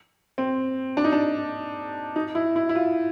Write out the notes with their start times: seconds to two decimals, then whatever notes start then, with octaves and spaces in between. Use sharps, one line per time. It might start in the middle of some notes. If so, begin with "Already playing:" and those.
0.38 C4
0.97 D4
1.04 D#4
1.12 D4
2.16 D#4
2.35 E4
2.56 E4
2.69 E4
2.75 F4